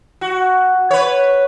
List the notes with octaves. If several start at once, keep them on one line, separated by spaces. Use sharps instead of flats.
F#4
B4 C#5